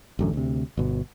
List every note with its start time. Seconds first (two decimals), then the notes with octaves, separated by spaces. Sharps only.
0.19 A1 F#2 D3
0.33 D2 C3
0.77 G1 B2